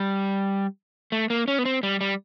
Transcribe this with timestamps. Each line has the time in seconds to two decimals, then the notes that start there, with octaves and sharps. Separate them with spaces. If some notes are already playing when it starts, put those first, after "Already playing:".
Already playing: G3
1.12 A3
1.30 A#3
1.48 C#4
1.59 B3
1.65 C4
1.83 G3
2.01 G3